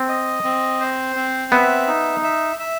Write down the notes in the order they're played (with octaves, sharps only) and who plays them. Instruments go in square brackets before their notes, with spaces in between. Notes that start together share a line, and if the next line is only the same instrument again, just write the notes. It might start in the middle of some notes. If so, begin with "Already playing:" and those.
Already playing: [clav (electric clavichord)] C4
[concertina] D#5
C4
C5
C4
[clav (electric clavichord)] B3 [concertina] E5
[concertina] D#4
E5
E5